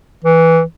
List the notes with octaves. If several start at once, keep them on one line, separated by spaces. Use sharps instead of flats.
E3